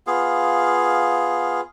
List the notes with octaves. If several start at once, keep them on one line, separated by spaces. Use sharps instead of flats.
B3 F4 G#4 F5